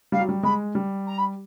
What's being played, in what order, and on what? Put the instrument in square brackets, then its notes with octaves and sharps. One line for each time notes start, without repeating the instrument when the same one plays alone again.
[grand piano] G3 [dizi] F5
[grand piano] F#3
G3
[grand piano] G#3 [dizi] B5
[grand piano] G3
[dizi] A#5
B5